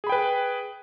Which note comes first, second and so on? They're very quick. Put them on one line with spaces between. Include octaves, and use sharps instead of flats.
G#4 B5 G5 B4